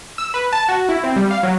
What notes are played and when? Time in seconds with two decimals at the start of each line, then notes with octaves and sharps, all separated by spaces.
0.18 E6
0.34 B4
0.53 A5
0.68 F#4
0.89 E4
1.04 C4
1.16 G3
1.31 F5
1.43 F#3